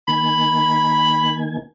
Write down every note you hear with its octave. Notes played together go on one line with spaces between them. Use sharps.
D#3 A#3 G#5 B5